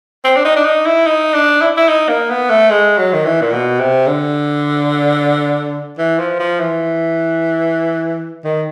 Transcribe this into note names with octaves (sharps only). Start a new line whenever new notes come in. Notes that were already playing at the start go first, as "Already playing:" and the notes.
C4
D4
D#4
D4
D#4
E4
D#4
D4
E4
E4
D#4
A#3
B3
A3
G#3
F#3
D#3
E3
A#2
B2
C3
D3
E3
F3
F3
E3
D#3